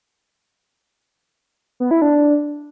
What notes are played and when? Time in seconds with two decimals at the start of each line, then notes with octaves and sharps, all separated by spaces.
1.80 B3
1.91 E4
2.02 D4